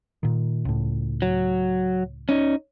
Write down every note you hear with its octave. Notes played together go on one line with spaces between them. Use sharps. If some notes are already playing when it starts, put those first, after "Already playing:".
A#2 D#3
C#2 A2
F#3
C#4 D#4